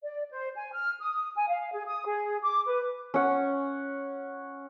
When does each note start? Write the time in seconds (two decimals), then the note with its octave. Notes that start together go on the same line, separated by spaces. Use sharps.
0.04 D5
0.31 C5
0.55 G#5
0.73 F6
1.00 D#6
1.35 G#5
1.49 F5
1.73 G#4
1.86 D#6
2.06 G#4
2.42 D6
2.66 B4
3.14 C#4 F#5